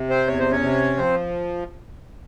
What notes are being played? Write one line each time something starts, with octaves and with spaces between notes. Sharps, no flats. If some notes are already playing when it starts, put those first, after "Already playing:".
Already playing: C3
C4 C5
E2 C#5
C5
C#4 C#5
C3
F3 C4 C5